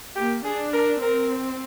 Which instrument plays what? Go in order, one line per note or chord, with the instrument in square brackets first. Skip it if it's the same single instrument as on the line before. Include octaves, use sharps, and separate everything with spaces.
[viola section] A#3 [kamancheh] G4
[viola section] D4 [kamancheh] G#4
[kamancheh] A#4
[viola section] C4 [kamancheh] A#4